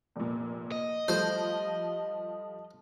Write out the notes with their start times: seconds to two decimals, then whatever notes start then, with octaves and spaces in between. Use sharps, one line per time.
0.16 F1 A#2
0.72 D#5
1.08 F3 G3 A3 C5